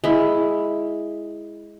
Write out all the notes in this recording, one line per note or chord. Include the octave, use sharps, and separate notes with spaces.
G#3 E4